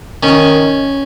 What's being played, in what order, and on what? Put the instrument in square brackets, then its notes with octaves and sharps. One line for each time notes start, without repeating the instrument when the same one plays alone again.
[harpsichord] D#3 C#4